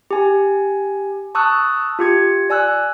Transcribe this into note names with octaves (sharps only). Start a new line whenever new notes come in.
G4 G#5
A5 C#6 D#6 E6 F#6
F4 G4 G#6 C#7
D5 G#5 E6 F#6